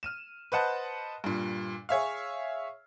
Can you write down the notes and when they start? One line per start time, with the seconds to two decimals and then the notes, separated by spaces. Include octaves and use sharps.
0.03 F6 D#7 E7
0.52 B4 C5 D#5 F#5 A5
1.24 G2 A#2
1.89 G#4 C#5 E5 F5